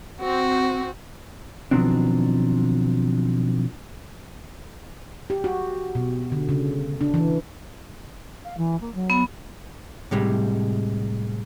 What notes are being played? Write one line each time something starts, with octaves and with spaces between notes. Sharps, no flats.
C4 F#4
B2 D#3 F3 F#3 C4 D4
G4
F#4
B2
D3
C#3
D4
E3
F5
E3
A#3
F#3
B3
A2 C3 G3 G#3